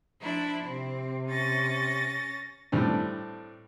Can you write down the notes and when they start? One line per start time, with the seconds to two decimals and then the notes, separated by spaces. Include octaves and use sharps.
0.21 F3 D4 E4
0.63 C3 C4
1.27 C#4 A6 A#6
2.72 A2 G3 C4 D4